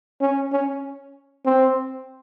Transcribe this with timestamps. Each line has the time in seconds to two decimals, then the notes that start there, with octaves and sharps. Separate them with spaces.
0.21 C#4
0.53 C#4
1.46 C4